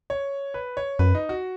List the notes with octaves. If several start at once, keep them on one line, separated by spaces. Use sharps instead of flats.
C#5
B4
C#5
F#2 B4
D#4
F#4